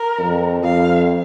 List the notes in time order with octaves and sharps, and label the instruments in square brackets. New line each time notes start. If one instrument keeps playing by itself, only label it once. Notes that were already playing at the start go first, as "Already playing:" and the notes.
Already playing: [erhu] A#4
[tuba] F2
[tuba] F2 [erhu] F5